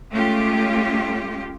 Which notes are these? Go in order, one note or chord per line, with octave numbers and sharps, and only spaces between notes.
G#3 A3 C#4 F4 G4